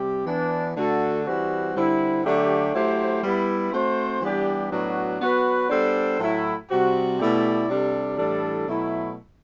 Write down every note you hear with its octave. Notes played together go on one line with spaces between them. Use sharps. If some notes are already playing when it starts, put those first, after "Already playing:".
Already playing: C3 G3 G4
E3 B3 D4
D3 A3 D4 F#4 A4
E3 G3 C4 F#4
D3 G3 C4 E4
D3 F#3 A3 D4 G4
F#3 A3 E4 G4 C5
G3 B3 E4
A3 C4 F#4 C5
E3 G3 B3 D4 G4
A2 F#3 B3 D4 F#4
F#3 B3 F#4 B4
G3 B3 D4 A4 C5
A2 F#3 A3 E4
C3 G3 C4 F#4
B2 A3 E4 G4 D5
C3 G3 D4 A4
A2 E3 G3 D4 A4
B2 F#3 A3 E4